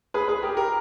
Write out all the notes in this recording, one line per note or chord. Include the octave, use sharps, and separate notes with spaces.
G#4 B4
G#4 B4
G4 A#4
G4 A#4